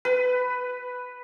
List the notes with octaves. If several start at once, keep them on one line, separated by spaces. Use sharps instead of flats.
B4